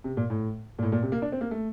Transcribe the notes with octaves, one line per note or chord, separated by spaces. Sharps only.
C3
A#2
A2
A#2
A2
A#2
C3
A#3
D4
C4
A#3
A3